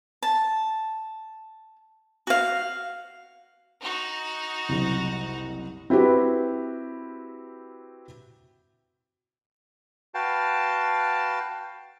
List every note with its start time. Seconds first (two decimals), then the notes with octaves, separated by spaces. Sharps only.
0.23 A5
2.27 F#4 F5
3.81 D#4 F#4
4.69 F#1 C2
5.90 C4 E4 F#4 G4 B4
10.14 F#4 B4 F5 G5 A5